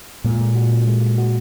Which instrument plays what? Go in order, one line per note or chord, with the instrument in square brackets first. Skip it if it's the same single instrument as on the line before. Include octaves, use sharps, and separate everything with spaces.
[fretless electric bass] A#2 A#3 [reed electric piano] G#3
[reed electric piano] G#3
F#4
C#4
G#3
G#3
F#4